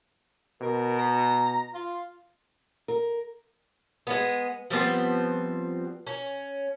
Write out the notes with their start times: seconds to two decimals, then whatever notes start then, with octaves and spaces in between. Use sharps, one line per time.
0.62 B2 A#4
0.98 A#5
1.75 F4
2.88 A#4
4.07 G#3 B3
4.70 F3 G3 B3 C4
6.07 C#4